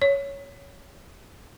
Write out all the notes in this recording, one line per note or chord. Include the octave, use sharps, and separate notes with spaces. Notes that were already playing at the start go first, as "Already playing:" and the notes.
C#5